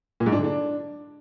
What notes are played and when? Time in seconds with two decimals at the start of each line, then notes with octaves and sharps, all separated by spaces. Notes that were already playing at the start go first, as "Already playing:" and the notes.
0.20 A#2
0.26 G#2
0.32 D4
0.38 D3
0.44 D4